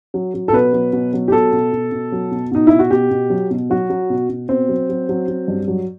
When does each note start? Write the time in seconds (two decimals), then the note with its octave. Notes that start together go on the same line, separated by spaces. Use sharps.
0.14 F#3
0.34 F#3
0.48 A4
0.53 B2 B4
0.73 F#3
0.93 B2
1.13 F#3
1.28 G4
1.32 B2 A4
1.53 B2
1.73 B2
1.92 B2
2.12 F#3
2.32 B2
2.52 B2 D#4
2.67 B2 E4
2.79 F#4
2.91 B2 G4
3.11 B2
3.30 F#3
3.51 B2
3.70 F#3 F#4
3.90 F#3
4.10 B2
4.29 B2
4.49 B2 C4
4.69 F#3
4.89 F#3
5.09 F#3
5.28 F#3
5.48 G2
5.68 F#3